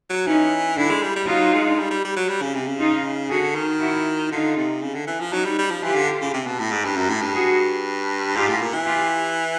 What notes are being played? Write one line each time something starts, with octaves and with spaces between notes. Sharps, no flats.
F#3
E3 C#4 D#4
D3 D4 E4
G#3
G3
G3
F#3 D#4 F4
G#3
G3
G3
G3
F#3
G3
C#3
C3
C#3
D#4 F4
D3 F#4 G#4
D#3
E4 F#4
D3 D#4 F4
C3
C#3
D3
E3
F3
F#3 C#4 D#4
G3
G3
F3
E3 F4 G4
D3
C#3
C3
B2
A2
G#2
G2
F#2
A2
G2
F#4 G#4
G#2 F4 G4
A2
A#2
E3
F4 G4